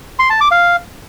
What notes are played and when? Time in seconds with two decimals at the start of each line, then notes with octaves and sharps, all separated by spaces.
0.19 C6
0.30 A5
0.41 D6
0.51 F5